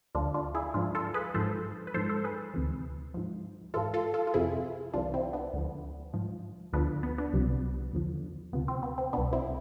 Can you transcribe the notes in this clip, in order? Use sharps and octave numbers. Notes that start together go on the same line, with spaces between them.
D2 D3 F3 D4 F4
D4 F4
E4 G#4
G#2 F3 D4 F4
F4 A4
G#4 B4
G#2 F3 A4 C5
B4
G#2 F3 A4 C5
A4 C5
G#4 B4
D2 C3 E3
G#2 F3
G#2 E3 F4 A4
F4 A4
F4 A4
F4
F2 C3 F3 E4 G#4
C2 C3 E3 D4 F4
C4 E4
B3 D4
D2 D3 F3
G#2 F3
D2 D3 F3 B3 D4
B3
B3 D4
C2 C3 F3
E2 D3 F3
D2 C3 F3 B3
C4
B3
C4
C2 B2 B3 D4
C4 E4